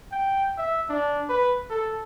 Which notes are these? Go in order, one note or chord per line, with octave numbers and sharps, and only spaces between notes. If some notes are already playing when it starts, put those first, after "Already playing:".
G5
E5
D4
B4
A4